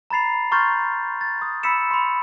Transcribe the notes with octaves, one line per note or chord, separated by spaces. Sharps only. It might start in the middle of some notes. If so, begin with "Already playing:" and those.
A#5 B5 A6 C7 F7
A#5 C6 C#6 F6 G6 A6
A6
D#6
B5 E6 B6 C#7 E7
B5 C6